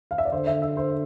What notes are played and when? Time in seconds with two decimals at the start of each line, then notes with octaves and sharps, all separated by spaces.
0.11 F5
0.18 E5
0.25 D5
0.32 D3 C5
0.47 E5
0.62 E5
0.77 C5